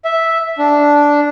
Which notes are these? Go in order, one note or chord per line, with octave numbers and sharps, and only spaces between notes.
E5
D4